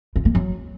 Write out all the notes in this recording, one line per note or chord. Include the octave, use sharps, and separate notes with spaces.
F4
A#3
F#3